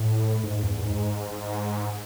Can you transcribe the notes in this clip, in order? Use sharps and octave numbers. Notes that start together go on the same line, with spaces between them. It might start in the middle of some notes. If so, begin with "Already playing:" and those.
Already playing: A2
G#2
E2
G#2